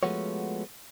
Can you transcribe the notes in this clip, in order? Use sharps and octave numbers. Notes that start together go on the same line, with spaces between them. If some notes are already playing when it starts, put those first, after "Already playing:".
F3 G#3 A3 B3 F#4 C#5